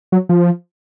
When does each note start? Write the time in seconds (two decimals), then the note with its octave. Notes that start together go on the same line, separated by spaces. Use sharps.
0.12 F#3
0.29 F3